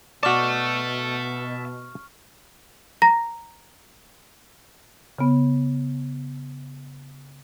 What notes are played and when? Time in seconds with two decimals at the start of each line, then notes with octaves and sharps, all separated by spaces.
0.23 B2 F#4 D5 E5 A5 C#6 F6
3.02 A#5 A#6
5.18 C#3 B3